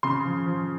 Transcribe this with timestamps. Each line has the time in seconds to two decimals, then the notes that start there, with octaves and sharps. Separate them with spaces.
0.03 C#3 C6
0.25 F3
0.46 F3